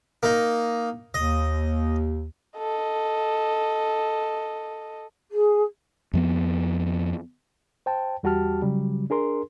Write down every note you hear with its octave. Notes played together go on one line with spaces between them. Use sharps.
A#3 D#4
D#2 D#5
A4 D#5
G#4
F2 F3 B3
C5 G5 A5
E2 G3 F#4 G4 A5 F6
C#3 F#3 G3
D4 G#4 A#4 C6